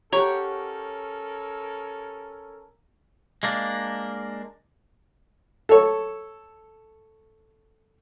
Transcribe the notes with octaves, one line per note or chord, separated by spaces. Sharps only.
C#4 G4 A4 A#4 C#5 F#5 A#5 C#6
G#3 A#3 D4
A4 C#5